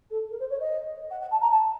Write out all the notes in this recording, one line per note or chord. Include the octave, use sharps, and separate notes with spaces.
A4
A#4
C5
C#5
D#5
F#5
F#5
A5
A#5
A5